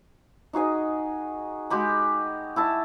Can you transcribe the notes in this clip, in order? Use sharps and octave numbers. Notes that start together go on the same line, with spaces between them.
D#4 F#4 G#4 D#5
G#3 F#4 G4 B5
E4 E5 A5